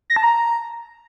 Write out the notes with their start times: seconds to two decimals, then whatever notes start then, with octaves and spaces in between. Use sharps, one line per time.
0.10 A#6
0.16 A5
0.23 A#5